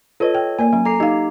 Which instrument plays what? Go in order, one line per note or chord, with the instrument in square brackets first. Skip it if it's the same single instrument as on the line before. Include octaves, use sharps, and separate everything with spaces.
[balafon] F4 B4 [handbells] A4 C#5 D#5
[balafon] G5
[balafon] A#3 A#4 D5 [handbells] G#5
[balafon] F#3 C#4
[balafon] A4 [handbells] A#5 D6 C7
[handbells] D#4 G4 [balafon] D#5 F5